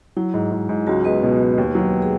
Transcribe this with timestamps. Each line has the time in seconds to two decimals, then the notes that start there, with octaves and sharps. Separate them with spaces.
0.17 F#3 E4
0.34 G#2
0.52 G#2
0.69 G#2
0.87 C#2 F#3 F#4
1.05 G#3 B3 B4
1.23 B2
1.41 G#3
1.58 D#2
1.75 F#3
2.02 G#4